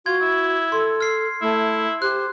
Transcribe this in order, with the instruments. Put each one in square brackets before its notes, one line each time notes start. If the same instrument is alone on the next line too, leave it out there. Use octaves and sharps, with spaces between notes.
[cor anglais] F4 [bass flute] F#4 [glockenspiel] G#6
[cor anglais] E4
[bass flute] A4 [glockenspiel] C6
[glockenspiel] F6 C7
[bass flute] A3 [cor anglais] E4
[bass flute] G4 [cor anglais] C5 [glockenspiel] F#6